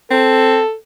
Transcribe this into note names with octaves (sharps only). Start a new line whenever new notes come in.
C4 A4